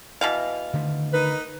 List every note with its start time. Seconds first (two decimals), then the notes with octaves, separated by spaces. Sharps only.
0.21 B2 E3 F5
0.74 D3 D#3 A3
1.13 D#4 A#4 B4